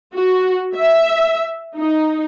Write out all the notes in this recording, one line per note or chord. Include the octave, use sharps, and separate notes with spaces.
F#4
E5
D#4